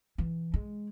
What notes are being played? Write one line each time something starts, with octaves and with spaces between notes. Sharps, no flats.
E3
G#3